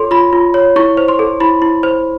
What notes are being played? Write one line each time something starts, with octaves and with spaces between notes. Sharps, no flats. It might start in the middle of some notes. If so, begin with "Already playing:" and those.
Already playing: F4 A4 C#5 C6
F4 B5
F4
C#5
E4 C#6
C5
C6
A4
E4 B5
E4
C5